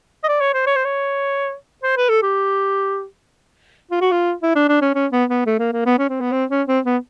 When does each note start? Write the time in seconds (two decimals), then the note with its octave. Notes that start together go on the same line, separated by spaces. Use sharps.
0.24 D#5
0.28 D5
0.40 C#5
0.54 C5
0.67 C#5
0.76 C5
0.85 C#5
1.83 C5
1.97 B4
2.09 A4
2.23 G4
3.91 F4
4.01 F#4
4.11 F4
4.43 E4
4.55 D4
4.68 D4
4.82 C#4
4.95 C#4
5.12 B3
5.30 B3
5.46 A3
5.59 A#3
5.73 A#3
5.86 B3
5.98 C#4
6.09 C4
6.20 B3
6.32 C4
6.50 C#4
6.68 C4
6.85 B3